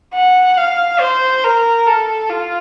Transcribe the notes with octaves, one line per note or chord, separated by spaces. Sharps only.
F#5
F5
C5
A#4
A4
F4